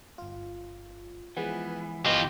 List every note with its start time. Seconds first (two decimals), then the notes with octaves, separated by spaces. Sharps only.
0.18 G1 F4
1.37 E3 F3 G#3 B3
2.06 G1 E3 B3 F4 G4 D#5 C#6